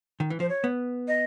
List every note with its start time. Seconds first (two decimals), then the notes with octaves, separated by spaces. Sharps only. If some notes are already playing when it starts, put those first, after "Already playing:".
0.20 D#3
0.30 E3
0.40 F3 C5
0.49 C#5
0.64 B3
1.08 D#5